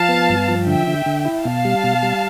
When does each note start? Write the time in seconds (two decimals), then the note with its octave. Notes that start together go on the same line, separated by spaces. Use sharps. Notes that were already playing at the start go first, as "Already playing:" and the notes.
Already playing: F3 F5 A5
0.09 B3
0.29 G2
0.48 F3
0.67 D3 E5 G5
0.87 D3
1.06 D3
1.25 E4
1.45 B2 F5 A5
1.65 G3
1.84 B2
2.03 G3